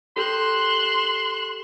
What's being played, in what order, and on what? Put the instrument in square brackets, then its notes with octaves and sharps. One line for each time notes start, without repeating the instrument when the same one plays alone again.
[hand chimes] G4 A4 G6 [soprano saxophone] C6 [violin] F#6 E7